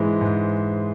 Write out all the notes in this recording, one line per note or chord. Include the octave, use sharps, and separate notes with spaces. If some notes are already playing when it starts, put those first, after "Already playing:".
Already playing: G#2 E3 G#3 C5
G#2